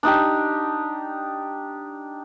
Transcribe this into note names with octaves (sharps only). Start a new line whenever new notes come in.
D4 D#4 G4